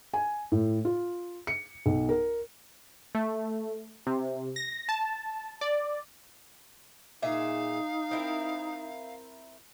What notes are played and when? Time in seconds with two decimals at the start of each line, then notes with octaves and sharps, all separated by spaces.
0.14 G#5
0.52 A2
0.85 F4
1.47 C#7
1.86 B1
2.09 A#4
3.15 A3
4.07 C3
4.56 A#6
4.89 A5
5.61 D5
7.22 A#2 D#4 G#4 E5 F5
8.11 C4 E4 A#4